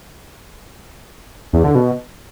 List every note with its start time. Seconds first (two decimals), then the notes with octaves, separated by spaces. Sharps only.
1.53 E2
1.64 D3
1.75 B2